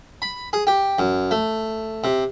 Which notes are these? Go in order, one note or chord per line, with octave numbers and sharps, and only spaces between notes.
B5
G#4
G4
F#2
A3
C3